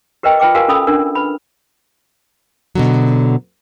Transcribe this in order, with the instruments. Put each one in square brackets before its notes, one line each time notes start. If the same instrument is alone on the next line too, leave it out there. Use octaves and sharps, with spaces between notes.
[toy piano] G4 A#4 B4 D#5 G5
F4 B4 G5 D6
F#4 G4 A#4 B4 F5 G#5
C#4 A4 B5 D#6 E6
C#4 D4 A#4
B4 B5
[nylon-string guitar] B2 D3 F#3